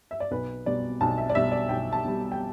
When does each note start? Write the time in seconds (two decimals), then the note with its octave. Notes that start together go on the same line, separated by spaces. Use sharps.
0.11 E5
0.20 D5
0.31 B1 B4
0.66 B2 G3 D5
1.01 B1 A5
1.18 E5
1.30 D5
1.35 B2 G3 E5
1.52 D5
1.69 B1 G5
1.93 A5
2.04 B2 G3
2.32 G5